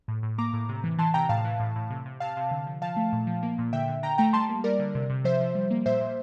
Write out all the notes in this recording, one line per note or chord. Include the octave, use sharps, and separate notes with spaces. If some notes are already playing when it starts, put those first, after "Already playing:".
A2
A2
A#3 A#5 D6
A2
C3
E3
E3 A5 C6
C3 G5 A#5
A2 F5 A5
E3
A2
A2
C3
C3
C3 F5 A5
C3
D3
F3
F3 F5 A5
A3
A#2
F3
A#3
A#2
D3 E5 G5
D3
D3 G5 A#5
A3 G5 A#5
G3 A5 C6
A#3
G3 A#4 D5
D3
C3
C3
F3 C5 E5
F3
G3
A#3
A#2 C5 E5
A#2